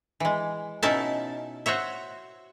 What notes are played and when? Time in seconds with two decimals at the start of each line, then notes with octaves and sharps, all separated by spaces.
0.20 E3 G#3
0.83 B2 C#4 D#4 E4 E5 A5
1.66 F#4 C5 C#5 E5